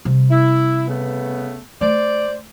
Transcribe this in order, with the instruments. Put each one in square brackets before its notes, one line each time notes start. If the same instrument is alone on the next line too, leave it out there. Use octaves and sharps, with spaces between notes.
[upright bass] C3 G3
[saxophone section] E4
C#3 A3 B3
[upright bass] A3 [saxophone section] C5 D5